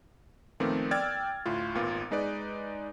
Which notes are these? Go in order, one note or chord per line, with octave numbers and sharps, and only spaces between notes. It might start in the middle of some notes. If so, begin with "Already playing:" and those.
A#2 D#3 F3 A3 B3 C4
D5 G5 E6 F6 G#6 A6
D2 A2 F4
G#1 A#2 B3 F4
G#3 D#4 B4 D5